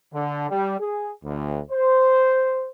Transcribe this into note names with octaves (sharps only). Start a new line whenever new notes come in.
D3
G3
G#4
D2
C5